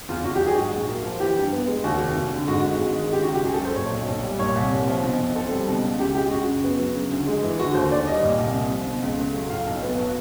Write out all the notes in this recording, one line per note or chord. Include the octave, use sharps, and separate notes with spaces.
E2 F4
E2 F#4
G4
F#3
G#4
G#2 F#4
A#1
A#3
F3
E3 G4
G2
B3
G#3
D#2 F#4
F1
F1
D3
G#2 F#4
G#1
G#3
D#3
C#3 G4
F#4
C#2
G4
C#2 G#4
A4
F#3 C5
A#2 C#5
B1
B1
G3
A#2 C#5
C2
C2
F3
B2
B1
C4 A4
G3
B2
C#2
C#2 G4
G#3 G4
C#3 F#4
F#2
B3
F#3
C#3
D2
G#3
E3
D3 F#4
D#2 C5
D#2 D5
G3 D#5
A#2
C2
C2
F3
B2
C#2
A3
F#3
A2 F5
B1
B3
F#3